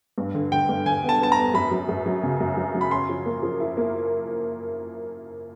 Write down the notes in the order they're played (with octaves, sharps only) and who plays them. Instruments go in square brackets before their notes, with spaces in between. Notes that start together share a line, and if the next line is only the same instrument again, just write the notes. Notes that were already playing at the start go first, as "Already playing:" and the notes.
[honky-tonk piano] G2
D3
[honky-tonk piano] D3 [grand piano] G5
[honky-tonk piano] G2
[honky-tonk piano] D3 [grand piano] G#5
[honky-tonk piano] B3
[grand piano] A5
[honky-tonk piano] B3 [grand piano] A5
[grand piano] A#5
[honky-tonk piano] B3
[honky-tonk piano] F#2 [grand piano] B5
[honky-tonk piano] F#3
F#2
F#3
C#3
F#2
F#3
F#3
[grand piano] B5
[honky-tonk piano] C#4 [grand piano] C6
[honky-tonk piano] F3
A#3
F3
E4
A#3